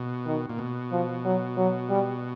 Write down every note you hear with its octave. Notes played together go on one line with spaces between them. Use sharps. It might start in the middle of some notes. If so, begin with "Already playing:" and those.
Already playing: B2
D#3
A#2
B2
F3
F#3
F#3
G3